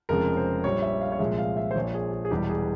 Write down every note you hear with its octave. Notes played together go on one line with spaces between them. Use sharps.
F1 F2 C#3 F3 G#3 A#4
C5
A#1 A#2 G3 C#5
E5
F5
C#5
C2 A#2 F3 G#3 E5
F5
E5
C5
A#1 A#2 F3 C#5
G#4
G#4
G#4
E1 E2 E3 G3 G4
G#4